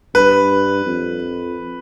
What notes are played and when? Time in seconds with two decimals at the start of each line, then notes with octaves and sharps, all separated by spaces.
0.15 G2 B4
0.86 F2